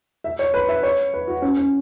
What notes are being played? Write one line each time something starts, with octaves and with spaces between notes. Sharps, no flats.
E5
C#5
B4
E5
C#5
B4
F#4
C#4
C#4